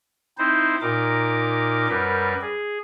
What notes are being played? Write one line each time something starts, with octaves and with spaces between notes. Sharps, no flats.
C4 D#4 E4 C5
A#2 D#4 A#4 D6
F#2 G3 A#4 B4
G#4